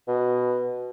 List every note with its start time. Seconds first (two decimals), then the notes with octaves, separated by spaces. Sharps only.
0.08 B2